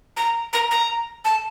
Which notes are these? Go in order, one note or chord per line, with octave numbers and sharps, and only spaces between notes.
A#5
A#5
A#5
A5